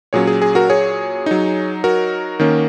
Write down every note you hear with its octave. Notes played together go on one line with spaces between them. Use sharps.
A#2 F#3 C#4 G#4 C#5
G#4
G#4
F#4 A#4
G#4 C#5
F#3 D#4
F#4 A#4
D#3 A#3 C#4